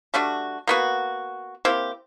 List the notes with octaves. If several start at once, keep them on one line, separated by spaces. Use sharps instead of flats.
G3 A3 D4 F#4
A#3 B3 F#4
A#3 C4 E4 G4